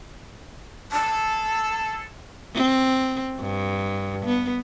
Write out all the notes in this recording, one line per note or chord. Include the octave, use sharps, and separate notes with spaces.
G#4 A4 A5
C4
G2
B3